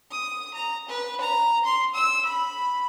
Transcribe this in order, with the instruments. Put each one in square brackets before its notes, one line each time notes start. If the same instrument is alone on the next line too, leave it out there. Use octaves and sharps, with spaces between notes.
[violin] D#6
A#5
B4
A#5
C6
E6
B5